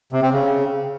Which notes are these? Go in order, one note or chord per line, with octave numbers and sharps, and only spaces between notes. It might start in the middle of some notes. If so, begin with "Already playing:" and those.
C3
C4
C#3